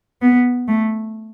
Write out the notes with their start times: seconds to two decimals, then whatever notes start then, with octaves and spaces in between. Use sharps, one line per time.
0.21 B3
0.68 A3